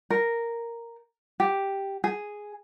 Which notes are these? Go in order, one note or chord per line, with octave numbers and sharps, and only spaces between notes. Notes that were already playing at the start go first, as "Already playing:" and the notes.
A#4
G4
G#4